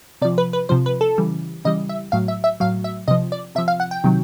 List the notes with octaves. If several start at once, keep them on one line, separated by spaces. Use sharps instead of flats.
C3 F3 D5
B4
B4
C3 F3 C5
B4
A4
C#3 E3 G3
C#3 E3 G3 D#5
E5
A2 F#3 F5
E5
E5
A2 F#3 F5
E5
C3 F3 D#5
D5
C3 F3 E5
F5
F#5
G5
C3 D#3 F#3